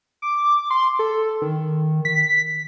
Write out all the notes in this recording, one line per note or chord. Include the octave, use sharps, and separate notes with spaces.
D6
C6
A4
D#3
B6